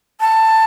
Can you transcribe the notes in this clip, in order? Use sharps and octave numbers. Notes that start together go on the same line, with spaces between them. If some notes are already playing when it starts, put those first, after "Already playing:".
A5